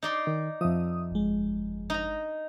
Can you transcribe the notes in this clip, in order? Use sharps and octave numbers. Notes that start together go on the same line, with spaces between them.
D#4 D5 C6
D#3
F2 F3 E5 D#6
G1 G#3
D#4 A#5